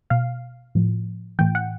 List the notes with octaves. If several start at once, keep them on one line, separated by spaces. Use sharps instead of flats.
B2 F5
A2 F3
A2 E3 G5
F#5